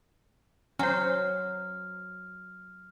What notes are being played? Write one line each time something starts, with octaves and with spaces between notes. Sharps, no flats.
F#3 C#4 C5 F6